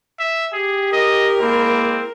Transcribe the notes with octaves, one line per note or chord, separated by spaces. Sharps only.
E5
G4 G#4
A#4 D#5
G#3 A#3 C4 E4